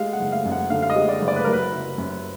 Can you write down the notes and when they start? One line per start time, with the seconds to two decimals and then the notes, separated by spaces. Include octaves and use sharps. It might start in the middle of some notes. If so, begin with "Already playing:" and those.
Already playing: G#3 F5
0.13 F#5
0.19 F#1
0.32 F5
0.45 F#2
0.52 F#5
0.70 D3 F5
0.82 F5
0.90 D#5
0.96 G#3
1.09 D5
1.22 F#1
1.28 D5
1.36 B4
1.44 F#3 A#4
1.53 B4
1.73 F#1
1.98 F#2